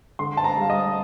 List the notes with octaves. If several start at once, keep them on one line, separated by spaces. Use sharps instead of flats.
D3 C6
A5
A#5
G3 F5
D#5